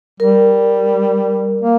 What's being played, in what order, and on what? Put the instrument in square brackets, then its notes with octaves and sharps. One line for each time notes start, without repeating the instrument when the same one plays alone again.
[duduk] G3 [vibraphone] A#4
[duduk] A#3